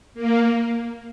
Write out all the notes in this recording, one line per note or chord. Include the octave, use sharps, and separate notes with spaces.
A#3